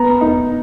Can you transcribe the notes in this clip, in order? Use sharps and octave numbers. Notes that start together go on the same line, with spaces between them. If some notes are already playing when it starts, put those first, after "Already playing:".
Already playing: B3 A#5
D#4